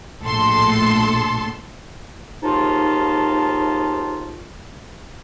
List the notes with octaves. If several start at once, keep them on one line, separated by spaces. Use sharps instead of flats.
A#1 A2 A4 C6
D#2 G#2 D#4 F4 A5